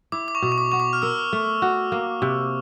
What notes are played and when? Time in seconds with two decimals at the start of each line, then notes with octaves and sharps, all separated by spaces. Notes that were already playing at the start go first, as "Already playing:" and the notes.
0.12 E4 D6
0.28 D6
0.35 C#6
0.42 B2
0.52 C#6
0.58 D6
0.72 B3 C#6
0.80 D6
0.93 F6
1.02 A#4 E6
1.33 A3
1.62 F#4
1.92 A#3
2.22 C3